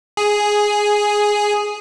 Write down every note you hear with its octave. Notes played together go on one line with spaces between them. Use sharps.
G#4